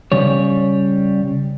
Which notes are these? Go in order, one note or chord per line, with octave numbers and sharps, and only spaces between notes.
C#3 G3 C#5